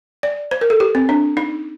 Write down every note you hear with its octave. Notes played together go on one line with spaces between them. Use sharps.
D5
C5
A#4
A4
G4
C4
D4
D#4